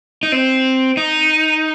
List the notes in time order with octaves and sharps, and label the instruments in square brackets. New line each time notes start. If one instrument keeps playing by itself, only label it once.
[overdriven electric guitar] D#4
C4
D#4